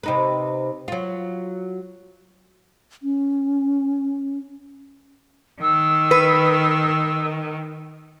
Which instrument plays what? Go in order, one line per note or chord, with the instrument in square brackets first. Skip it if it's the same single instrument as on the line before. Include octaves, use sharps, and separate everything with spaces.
[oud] C3 D#4 B4
F#3 F4
[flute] C#4
[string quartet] D#3 [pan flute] E6
[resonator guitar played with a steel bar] B4